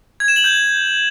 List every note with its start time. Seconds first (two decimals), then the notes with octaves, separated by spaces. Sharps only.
0.20 G#6
0.28 E7
0.36 F#7
0.44 G6